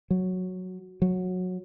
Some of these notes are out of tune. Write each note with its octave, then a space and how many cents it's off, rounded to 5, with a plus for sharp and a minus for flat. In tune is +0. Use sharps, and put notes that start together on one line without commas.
F#3 -5
F#3 -15